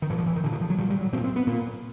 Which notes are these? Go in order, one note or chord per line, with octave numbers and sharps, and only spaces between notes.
D#3
A#2 E3
F3
E3
D#3
A#2 D3
D#3
F3
F#3
A#2 G3
G3
F#3
A#2 C4
C4
B3
A#2 A#3